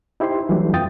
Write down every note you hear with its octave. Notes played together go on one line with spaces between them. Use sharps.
D#4 E4 G4 C5 C6
E3 F#3 G3 A3 D4
F2 F4 G5 D#6 A6